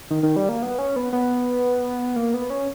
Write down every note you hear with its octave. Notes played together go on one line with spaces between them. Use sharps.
D#3
D#3
G3
A#3
B3
C#4
B3
B3
A#3
B3
C#4